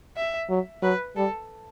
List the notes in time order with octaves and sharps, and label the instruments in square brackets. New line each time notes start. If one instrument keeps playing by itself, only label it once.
[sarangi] E5
[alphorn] F#3
[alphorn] F#3 [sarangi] B4
[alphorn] G3 [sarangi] A4